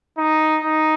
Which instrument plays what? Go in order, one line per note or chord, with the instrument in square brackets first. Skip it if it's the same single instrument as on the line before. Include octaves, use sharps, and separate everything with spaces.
[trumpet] D#4
D#4